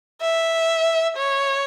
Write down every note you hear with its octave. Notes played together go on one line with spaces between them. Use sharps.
E5
C#5